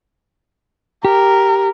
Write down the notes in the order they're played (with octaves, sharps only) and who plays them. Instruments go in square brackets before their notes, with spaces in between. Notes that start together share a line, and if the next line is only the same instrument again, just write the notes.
[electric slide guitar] G4 [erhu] A#4